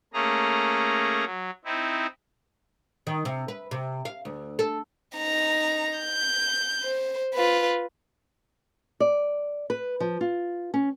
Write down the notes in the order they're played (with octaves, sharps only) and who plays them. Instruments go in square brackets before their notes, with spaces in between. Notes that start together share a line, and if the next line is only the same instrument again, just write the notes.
[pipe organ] A3 A#3 C#4 G#4 A#5
F#3
C4 D#4 E4
[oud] D#3
C3
B4
C3
F5
D2
A4
[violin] D#4 A#5
G6
C5
F4 B4
[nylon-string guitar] D5
B4
F3
F4
C#4